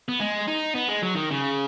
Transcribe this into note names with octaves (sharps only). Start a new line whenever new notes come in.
B3
G#3
D#4
B3
G#3
F#3
D#3
C#3